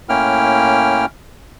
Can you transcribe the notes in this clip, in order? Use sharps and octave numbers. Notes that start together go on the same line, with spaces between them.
A2 A#3 C#4 E4 G5 F6